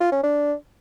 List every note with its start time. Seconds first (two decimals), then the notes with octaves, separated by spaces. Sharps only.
0.01 F4
0.12 C#4
0.23 D4